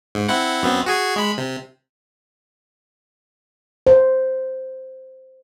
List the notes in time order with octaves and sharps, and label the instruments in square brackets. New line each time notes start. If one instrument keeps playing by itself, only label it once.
[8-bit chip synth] G#2
C4 E4 F#5
F#2 B3 C4
F#4 G#4 G#5
G#3 B5
C3
[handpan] C5